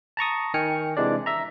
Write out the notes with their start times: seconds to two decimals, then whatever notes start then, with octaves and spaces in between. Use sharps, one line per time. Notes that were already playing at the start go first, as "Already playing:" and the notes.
0.17 A5 A#5 C#6 D#6
0.54 D#3 G5 G#5 F6 C#7
0.97 C3 E3 G#3 D4 D5
1.26 E5 A#5